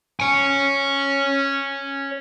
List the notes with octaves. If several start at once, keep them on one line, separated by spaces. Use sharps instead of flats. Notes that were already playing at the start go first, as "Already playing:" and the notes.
C#5 G#5